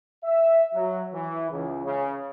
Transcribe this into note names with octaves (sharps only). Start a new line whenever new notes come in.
E5
F#3
E3
C#2
C#3